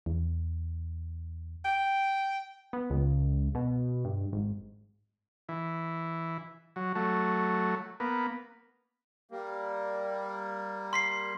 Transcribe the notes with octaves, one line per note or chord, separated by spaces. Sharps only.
E2
G5
B3
C#2
B2
G2
G#1
E3
F#3
F#3 A3
A#3 B3
G3 A#3
C6 B6 C7